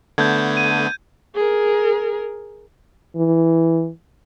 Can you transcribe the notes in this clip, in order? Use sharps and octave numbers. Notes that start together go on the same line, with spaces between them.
D3 A3 B3 G6 G#6
D#7
G#4 A#4
E3